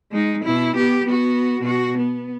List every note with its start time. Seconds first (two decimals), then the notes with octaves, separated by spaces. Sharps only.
0.12 G#3 D#4
0.44 B2 E4
0.76 B3 G4
1.06 B3 F#4
1.62 B2 F#4
1.98 B3